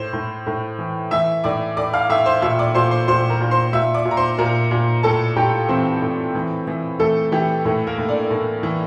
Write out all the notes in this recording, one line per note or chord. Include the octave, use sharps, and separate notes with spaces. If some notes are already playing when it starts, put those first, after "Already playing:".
Already playing: A2 C5
A2
A2
E3
E3 E5 E6
A2 D5 D6
A2 D5 D6
F5 F6
A2 E5 E6
C5 C6
A#2 E5 E6
D5 D6
A#2 C5 C6
C5 C6
A#2 C5 C6
A#4 A#5
A#2
C5 C6
A#2 E5 E6
D5 D6
A#2
A#5
C5 C6
A#2 A#4 A#5
A#2
A2 A4 A5
A2 G4 G5
E3 C4 C5
A2
E3
E3
E3 A3 A4
E3 G4
A2 A3 A4
A#3 A#4
A2
D4 D5
A2
E3